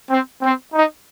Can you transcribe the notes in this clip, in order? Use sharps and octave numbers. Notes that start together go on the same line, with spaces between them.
C4
C4
D#4